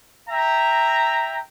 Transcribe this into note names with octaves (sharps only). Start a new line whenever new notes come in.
E5 G5 A#5